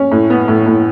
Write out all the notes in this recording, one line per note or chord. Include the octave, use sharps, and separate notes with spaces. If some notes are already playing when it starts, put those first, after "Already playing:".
Already playing: C#4
A2
B3
A2
A2